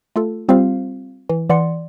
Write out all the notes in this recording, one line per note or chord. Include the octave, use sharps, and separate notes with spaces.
A3 F4 A4
G3 C4 F4 G4 C5 F5
E3
E3 D5 F#5 C6 C#7